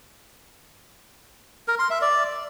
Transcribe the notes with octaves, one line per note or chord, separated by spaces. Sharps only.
A#4
C6
E5
D5